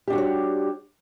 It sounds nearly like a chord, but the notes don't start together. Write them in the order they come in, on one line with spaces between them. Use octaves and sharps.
G4 D4 F#4 G3 C#5